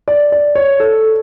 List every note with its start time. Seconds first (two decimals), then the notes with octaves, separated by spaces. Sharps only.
0.08 D5
0.32 D5
0.55 C#5
0.80 A4